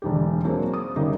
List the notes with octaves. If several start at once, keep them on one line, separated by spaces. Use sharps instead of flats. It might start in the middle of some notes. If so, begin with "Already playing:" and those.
E1 D2 G4
F#3 A#3 C4 D4 G#4 C5
D#6
F#1 C#3 G3 D#4 G4 A#4